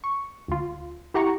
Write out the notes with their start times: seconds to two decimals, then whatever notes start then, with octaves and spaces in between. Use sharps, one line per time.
0.04 C#6
0.48 D2 F4
1.14 E4 G4 F#5 A#5 C#6